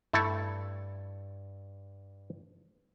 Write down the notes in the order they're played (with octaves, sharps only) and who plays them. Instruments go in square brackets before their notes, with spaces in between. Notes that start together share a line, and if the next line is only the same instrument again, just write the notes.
[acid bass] G2 [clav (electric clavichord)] A3 E4 A4